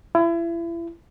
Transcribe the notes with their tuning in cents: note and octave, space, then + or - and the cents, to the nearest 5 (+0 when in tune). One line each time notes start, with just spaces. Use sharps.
E4 +35